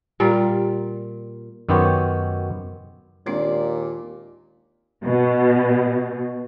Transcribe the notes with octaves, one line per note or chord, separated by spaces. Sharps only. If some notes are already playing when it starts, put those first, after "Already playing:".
A#2 G3 F4 A#4
F#2 D#3 B3 G4 C5 C#5
D#2 A#2 G#3 C4 D4 D5
B2